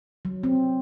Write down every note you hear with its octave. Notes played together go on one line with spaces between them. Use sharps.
F#3
C4